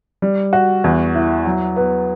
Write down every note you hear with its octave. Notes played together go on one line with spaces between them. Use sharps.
G3
F#4
E2
E4
F#3
B3